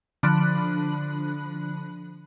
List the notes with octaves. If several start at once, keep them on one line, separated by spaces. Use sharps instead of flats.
D3 F3 D4 B5 F#6